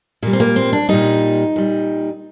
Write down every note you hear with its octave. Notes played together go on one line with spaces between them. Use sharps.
A#2 G3 A#3
C4
A#3
C4
D4
A#2 G3 D#4
A#2 G3